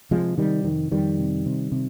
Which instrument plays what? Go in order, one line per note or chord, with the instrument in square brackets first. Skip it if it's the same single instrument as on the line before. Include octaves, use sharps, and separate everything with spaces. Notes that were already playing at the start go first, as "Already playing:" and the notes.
[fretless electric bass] C3 F3 G#3
C3 D#3 G3
F2 D#3
F2 D#3 G3
C3
C3
C3